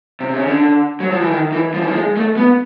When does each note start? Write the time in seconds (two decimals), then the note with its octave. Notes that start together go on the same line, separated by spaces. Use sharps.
0.20 C3
0.33 C#3
0.47 D3
1.00 F#3
1.11 F3
1.21 E3
1.31 D#3
1.52 E3
1.74 F3
1.81 E3
1.88 F3
1.94 G#3
2.17 A3
2.37 B3